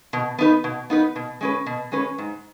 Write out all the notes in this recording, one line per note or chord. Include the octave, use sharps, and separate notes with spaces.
B2
B3 D#4 B4
B2
B3 D#4 B4
B2
G#3 C#4 B4
B2
G#3 C#4 B4
G#2